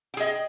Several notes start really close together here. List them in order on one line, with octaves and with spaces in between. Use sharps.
G5 G#4 D#5